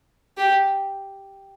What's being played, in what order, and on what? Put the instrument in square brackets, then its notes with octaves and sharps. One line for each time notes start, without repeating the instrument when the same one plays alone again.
[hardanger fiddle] G4